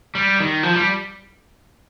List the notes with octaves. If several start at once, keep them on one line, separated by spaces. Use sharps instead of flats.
G3
D#3
F3
G3